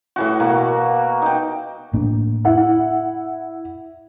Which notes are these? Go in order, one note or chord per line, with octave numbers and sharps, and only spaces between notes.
A2 E3 F#4
B2 A#3
D#4 G5
A2 A#3 D4
E4 F#5